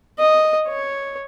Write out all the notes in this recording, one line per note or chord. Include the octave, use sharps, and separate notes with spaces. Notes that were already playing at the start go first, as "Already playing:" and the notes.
D#5
C#5